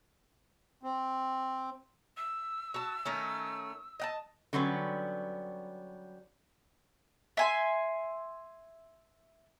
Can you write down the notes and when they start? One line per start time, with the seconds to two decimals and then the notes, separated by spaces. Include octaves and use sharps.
0.83 C4
2.17 E6
2.74 F#4 A5
3.05 D#3 A3 C#4
4.00 D#5 F#5 A5
4.53 D3 F#3 G3 B3 C#4
7.37 E5 G#5 C6